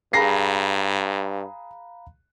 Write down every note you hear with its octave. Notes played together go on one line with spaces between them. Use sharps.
G2 G#4 F5 A#5 B5 A#6 C7